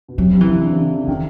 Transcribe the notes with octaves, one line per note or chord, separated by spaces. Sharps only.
B2
C3 F#3
C3
E3
C#3
D3
C3
C#3
D3
D#3 E3